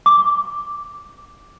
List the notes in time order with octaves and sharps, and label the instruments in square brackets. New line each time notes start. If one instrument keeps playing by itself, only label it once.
[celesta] D6